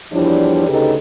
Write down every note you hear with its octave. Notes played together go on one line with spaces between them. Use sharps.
E2 F3 G3 D4 E4 C#5
D2 C#3 D#4 G4 A4 B4